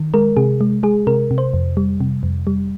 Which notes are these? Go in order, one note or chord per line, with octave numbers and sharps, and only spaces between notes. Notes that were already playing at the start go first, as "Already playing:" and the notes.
Already playing: D#3
G#3 A#4
C3 G#4
G#3
G#3 G#4
C3 A#4
C3
C5
F2
G3
C3
F2
G3